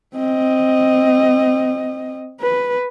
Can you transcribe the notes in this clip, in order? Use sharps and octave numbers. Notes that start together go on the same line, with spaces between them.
C4 D#5
B4